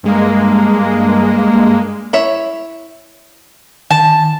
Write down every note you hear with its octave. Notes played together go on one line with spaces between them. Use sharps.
G2 G#3 A#3
E4 C#5 E5
D#3 A5